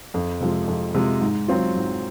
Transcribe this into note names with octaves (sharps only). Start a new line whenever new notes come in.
F2
C3 F3 G#3
F2
C3 F3 G#3
G#2
F#3 C4 F4
G#2